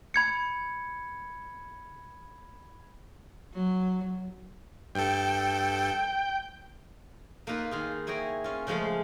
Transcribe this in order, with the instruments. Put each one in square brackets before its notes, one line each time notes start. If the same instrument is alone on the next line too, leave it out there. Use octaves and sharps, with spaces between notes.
[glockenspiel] B5 G#6 C#7
[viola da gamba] F#3
[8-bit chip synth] G2 A4 [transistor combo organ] G5
[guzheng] A#3 D#4 F4 B4
D#3 F4 G#4
E4 G#4 C#5 G5 A#5
C#4 F4
C#3 F3 G#3 A3 F5